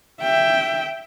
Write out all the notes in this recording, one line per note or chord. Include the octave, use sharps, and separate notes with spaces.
E5 G5